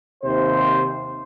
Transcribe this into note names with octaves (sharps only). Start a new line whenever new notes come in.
D#2 C3 C5